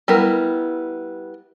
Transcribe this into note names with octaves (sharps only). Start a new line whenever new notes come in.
G3 B3 E4 A#4